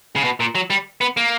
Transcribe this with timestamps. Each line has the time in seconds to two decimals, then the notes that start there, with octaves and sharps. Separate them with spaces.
0.16 C#3
0.24 B2
0.40 A#2
0.55 F#3
0.70 G3
1.01 B3
1.17 A#3